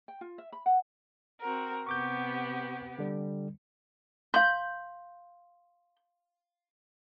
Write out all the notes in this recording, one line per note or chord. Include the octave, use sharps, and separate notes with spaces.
G5
F4
E5
B5
F#5
C4 F#4 A#4
C3 B3 G4 C#6 D6 G6
D3 G3
F5 C6 G6